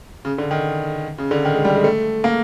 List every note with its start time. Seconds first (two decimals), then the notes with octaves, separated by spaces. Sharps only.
0.25 C#3
0.38 D3
0.51 D#3
1.18 C#3
1.31 D3
1.45 D#3
1.54 G#3
1.65 G3
1.74 G#3
1.84 A3
2.24 A#3